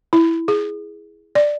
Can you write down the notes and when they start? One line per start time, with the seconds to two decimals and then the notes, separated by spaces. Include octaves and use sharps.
0.13 E4
0.48 G#4
1.35 D5